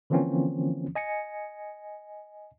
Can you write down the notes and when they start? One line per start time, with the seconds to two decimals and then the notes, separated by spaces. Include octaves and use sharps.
0.10 D3 E3 F3 A#3 C4 C#4
0.95 D#5 G#5 A#6 C#7